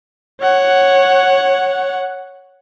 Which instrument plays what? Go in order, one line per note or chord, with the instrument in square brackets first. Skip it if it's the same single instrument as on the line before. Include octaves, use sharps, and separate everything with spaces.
[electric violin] C#5 F#5